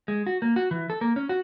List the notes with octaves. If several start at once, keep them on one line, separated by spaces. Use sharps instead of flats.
G#3
F#4
A#3
F#4
E3
A4
A#3
C#4
F#4